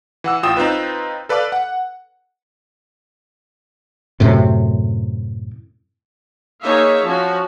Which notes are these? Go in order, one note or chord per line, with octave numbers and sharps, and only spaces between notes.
E3 F#5 E6
A1 F4 G5 D#6 E7
C4 D#4 F4 B4
A4 B4 D5 F5 D6
F#5
F#2 A2 C3
A#3 D#4 G#4 C#5 E5 F5
F3 C#4 F#4